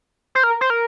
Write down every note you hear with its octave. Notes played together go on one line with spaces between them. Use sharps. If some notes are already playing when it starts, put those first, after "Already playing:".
C5
A#4
C5
A#4